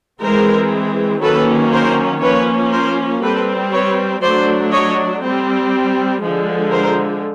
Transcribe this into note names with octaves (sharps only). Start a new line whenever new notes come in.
E3 G#3 C4 A#4 C5
D#3 F#3 A#3 C#4 A4 B4
A#4 C5
F3 A#3 C#4 B4 C#5
A#4 C5
G3 C4 A4 B4
B4 C#5
F#3 A3 D4 C5 D5
C#5 D#5
G3 C4
D3 F3 G#3
A#4 C5